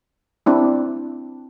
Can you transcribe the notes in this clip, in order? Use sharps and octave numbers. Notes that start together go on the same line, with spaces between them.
C4 D4 E4